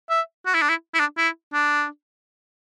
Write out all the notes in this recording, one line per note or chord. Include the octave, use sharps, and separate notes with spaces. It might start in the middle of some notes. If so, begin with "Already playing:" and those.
E5
F#4
E4
D4
E4
E4
D4
E4
D4